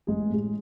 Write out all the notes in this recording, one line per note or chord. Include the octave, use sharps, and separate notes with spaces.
A1 G#3 G#4
A2 G#3